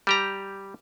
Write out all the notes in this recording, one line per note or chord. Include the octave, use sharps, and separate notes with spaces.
G3 G4 A#5